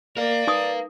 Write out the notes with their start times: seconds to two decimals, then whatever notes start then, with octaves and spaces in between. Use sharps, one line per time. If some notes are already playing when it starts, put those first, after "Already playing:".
0.17 A#3 A#4 D5 F5
0.47 D#4 B4 D#6